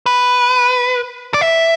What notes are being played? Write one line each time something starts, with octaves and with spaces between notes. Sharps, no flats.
B4
D5
E5